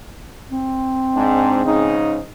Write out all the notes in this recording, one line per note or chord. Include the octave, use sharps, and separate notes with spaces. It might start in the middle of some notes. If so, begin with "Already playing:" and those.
C4
G#2 D4
G#2 C#3 D#4